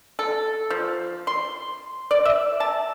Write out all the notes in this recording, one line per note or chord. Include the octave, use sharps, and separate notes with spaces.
A4
F3
C6
D5
E5
A5